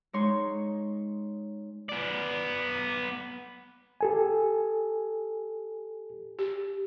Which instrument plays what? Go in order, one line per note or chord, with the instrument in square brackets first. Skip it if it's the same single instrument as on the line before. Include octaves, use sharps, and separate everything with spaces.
[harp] G#3 D#4 C#5 C6
[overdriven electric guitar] B3 D5
[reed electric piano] G4 A4 G#5
[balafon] G4